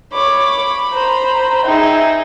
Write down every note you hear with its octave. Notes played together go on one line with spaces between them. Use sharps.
C#5 B5 D6
C5 A#5
D#4 G#4 E5 G5